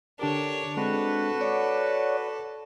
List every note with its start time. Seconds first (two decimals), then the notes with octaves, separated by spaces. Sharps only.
0.19 D3 D4 G4 A#4 C#5 D6
0.77 G#3 C4 D4 F#4 A4 B4
1.41 C#5 D5 F#5